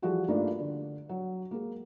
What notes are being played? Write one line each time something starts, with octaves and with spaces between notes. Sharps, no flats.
E3 F3 G3 F#4 G#4
G2 A3 A#3 D4 D#4 F4
D3
F#3
G#3 A#3